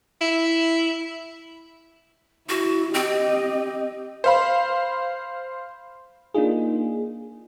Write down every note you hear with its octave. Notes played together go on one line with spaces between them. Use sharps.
E4
E4 F#4
C4 G4 D#5
C5 F5 B5
A#3 D4 D#4 F4 G#4